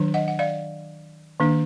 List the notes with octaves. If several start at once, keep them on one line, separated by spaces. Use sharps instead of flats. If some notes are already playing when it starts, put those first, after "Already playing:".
Already playing: D#3 F#3 D4
D#5 F#5
F#5
D5 F5
D#3 A#3 D4